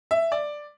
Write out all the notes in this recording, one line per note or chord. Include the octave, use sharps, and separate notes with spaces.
E5
D5